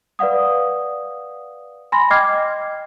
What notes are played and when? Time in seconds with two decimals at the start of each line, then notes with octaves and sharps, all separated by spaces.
0.19 B4 D5 F5 F#5 D#6
1.92 G#5 B5 C6 A#6
2.11 D#5 G5 D6 F6 G#6 C7